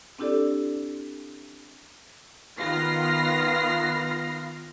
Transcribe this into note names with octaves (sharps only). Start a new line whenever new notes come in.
C4 D4 E4 G4 A4 D5
D#3 B3 F4 F6 A#6 C7